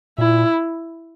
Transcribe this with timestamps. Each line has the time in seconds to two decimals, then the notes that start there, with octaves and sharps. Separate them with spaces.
0.18 A#2 E4